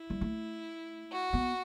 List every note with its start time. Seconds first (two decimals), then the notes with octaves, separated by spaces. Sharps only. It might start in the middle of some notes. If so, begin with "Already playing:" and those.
Already playing: E4
0.10 G3
0.21 A3
1.12 F#4
1.33 B3